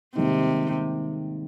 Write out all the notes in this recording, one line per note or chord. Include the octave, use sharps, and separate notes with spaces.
G#2 C3 D#3 G3 A#3 D#4